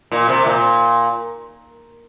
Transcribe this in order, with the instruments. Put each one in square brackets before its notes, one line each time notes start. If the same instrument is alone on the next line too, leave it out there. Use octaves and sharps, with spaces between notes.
[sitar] A#2
C3
A#2